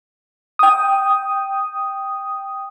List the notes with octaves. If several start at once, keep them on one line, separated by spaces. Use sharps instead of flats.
G5 D#6